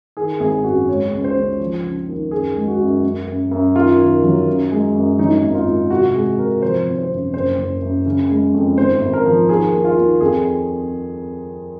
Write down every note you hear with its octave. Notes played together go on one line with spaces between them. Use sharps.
D#3 G#4
G#1 G#4
F#2 F#4
G#3 C#5
C#2
C5
C#2
F3
C#3
D#2
F#2 G#4
G#3
F#4
F#2
F#2
F#2
F#2
D#2 F4
D#3
F#3
F#2
G#3
F#2
F#3 D#4
G#1
F4
G#1
C3 F#4
G#3 G#4
C3 A#4
F3 C5
G#1
C5
F#2
F#1 C5
F#1
F#2
C#3
G#3
F2
G#1 C5
G#1
A#4
F3
D#2 G#4
D#2
F4
D#2
F2 G#4